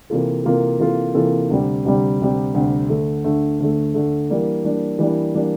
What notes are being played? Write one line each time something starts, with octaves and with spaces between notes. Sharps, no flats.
C3 E3 A#3 F4 A4
C3 E3 A#3 F4 A4
C3 E3 A#3 F4 A4
C3 E3 A#3 F4 A4
D2 C3 G3
D2 C3 G3
D2 C3 G3
D2 C3 G3
D2 D3 A3
D2 D3 A3
D2 D3 A3
D2 D3 A3
E3 G3 A#3 D4
E3 G3 A#3 D4
E3 G3 A#3 D4
E3 G3 A#3 D4